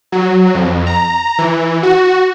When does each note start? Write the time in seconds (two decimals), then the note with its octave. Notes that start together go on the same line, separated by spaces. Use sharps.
0.12 F#3
0.55 F2
0.87 A#5
1.38 E3
1.83 F#4